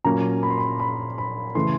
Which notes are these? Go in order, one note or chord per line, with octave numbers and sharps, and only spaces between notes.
A#2 F#3 A#3 C#4 A#5
B5
C6
B5
B5
B5
C#3 E3 A3 C6